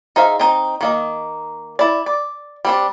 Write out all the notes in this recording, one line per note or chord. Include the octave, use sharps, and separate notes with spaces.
D#4 G#4 C5 E5 F5
C4 D#4
D#3 A#3 D#5
E4 D5
D5
G3 C4 D4